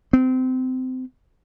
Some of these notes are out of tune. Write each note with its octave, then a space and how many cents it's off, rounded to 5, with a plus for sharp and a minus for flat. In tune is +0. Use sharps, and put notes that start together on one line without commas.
C4 -25